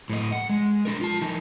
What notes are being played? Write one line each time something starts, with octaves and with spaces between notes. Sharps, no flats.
A2 D#5
F#5
G#3
D4 A#4
F4 A5
E3 D#4